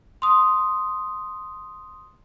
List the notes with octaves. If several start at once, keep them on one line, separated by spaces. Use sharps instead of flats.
C6 D#6